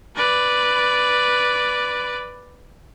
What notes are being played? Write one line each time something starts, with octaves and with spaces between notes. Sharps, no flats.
B4 D5